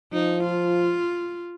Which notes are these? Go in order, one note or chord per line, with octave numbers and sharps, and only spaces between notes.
F3 D#4
F4